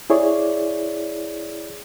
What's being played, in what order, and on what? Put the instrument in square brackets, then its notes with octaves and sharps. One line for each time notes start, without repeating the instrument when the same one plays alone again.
[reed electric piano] E4 G#4 C#5 D5